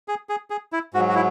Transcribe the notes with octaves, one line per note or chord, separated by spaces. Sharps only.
G#4
G#4
G#4
E4
G#2 F#3 F#4
F#4
E4